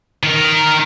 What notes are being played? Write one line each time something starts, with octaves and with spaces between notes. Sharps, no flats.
D#3 A#4